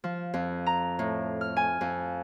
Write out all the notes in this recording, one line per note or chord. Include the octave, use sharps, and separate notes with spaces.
F3
F2
A#5
A2
F6
G#5
F2